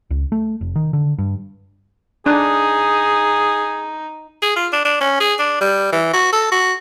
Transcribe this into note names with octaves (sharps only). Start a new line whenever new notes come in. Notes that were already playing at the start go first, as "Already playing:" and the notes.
C#2
A3
F1
D#3
D3
G2
D4 D#4 G#4
G#4
F4
D4
D4
C#4
G#4
D4
G3
E3
F#4
A4
F#4